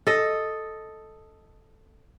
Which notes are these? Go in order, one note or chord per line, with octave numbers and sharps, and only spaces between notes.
A4 D#5